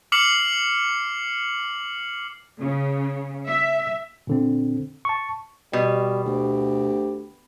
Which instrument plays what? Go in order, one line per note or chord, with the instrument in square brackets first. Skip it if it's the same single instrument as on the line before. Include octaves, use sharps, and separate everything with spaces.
[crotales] D6 F6 C7 C#7 F#7
[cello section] C#3
E5
[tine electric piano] A#2 D3 C4
A5 C#6
[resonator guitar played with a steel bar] B2 [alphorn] G3
[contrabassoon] D2 [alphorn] G4